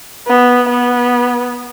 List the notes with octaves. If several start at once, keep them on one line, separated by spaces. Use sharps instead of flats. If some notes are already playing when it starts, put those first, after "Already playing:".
B3
B3